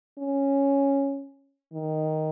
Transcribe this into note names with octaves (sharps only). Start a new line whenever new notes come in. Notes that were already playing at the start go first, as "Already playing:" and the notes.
C#4
D#3